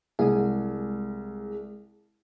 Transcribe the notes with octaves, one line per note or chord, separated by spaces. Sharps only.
C2 G#3 G#4